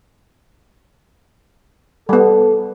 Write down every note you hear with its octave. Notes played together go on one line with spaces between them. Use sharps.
G3 B3 A4